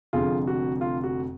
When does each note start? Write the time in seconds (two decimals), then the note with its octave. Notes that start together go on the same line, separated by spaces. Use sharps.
0.13 F1 F2 D3 F4 G#4
0.47 F#4
0.81 F4
1.04 F#4